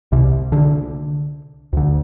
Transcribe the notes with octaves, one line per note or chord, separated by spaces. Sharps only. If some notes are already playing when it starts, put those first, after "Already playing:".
C2 C3
D3
D2 D3